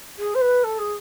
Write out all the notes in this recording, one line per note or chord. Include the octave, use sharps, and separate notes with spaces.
G#4
C5
B4
A4
G#4